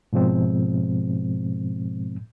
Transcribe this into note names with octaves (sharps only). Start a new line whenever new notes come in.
G#2 B2 F3 G#3 C4